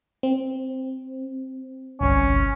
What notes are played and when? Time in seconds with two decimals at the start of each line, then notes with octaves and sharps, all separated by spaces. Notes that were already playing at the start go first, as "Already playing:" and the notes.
0.23 C4
2.00 G1 C2 C#4